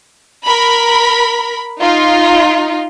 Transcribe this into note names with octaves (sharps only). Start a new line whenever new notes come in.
A#4 B5
D#4 F4